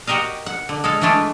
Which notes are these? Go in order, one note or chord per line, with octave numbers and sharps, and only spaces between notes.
F#4 G4 A#4 D#5 F5
F#5
D3
G#3 A4 F5
E3 G#3 A3 D4 F4